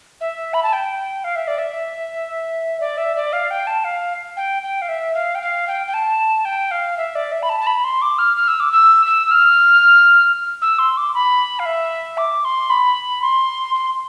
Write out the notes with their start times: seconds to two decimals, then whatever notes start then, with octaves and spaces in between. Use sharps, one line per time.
0.21 E5
0.54 B5
0.63 A5
0.73 G5
1.24 F5
1.36 E5
1.48 D5
1.58 E5
2.80 D5
2.97 E5
3.16 D5
3.33 F5
3.51 G5
3.67 A5
3.84 F5
4.37 G5
4.63 G5
4.82 F5
4.89 E5
5.15 F5
5.35 G5
5.41 F5
5.67 G5
5.87 G5
5.94 A5
6.45 G5
6.71 F5
6.97 E5
7.15 D5
7.32 E5
7.43 B5
7.49 A5
7.61 A5
7.67 B5
7.84 C6
8.02 D6
8.18 F6
8.37 F6
8.48 E6
8.60 D6
8.72 E6
9.06 E6
9.31 F6
10.62 E6
10.79 C6
10.97 D6
11.15 B5
11.59 F5
11.65 E5
12.18 D6
12.45 C6
12.70 B5
13.22 C6
13.75 C6